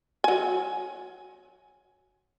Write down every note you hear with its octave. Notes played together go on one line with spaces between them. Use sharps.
F#3 G#5